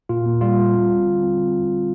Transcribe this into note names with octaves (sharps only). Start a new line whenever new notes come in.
A#2 F4
A#3
G3 F4
G3
C4
G3
D3
C4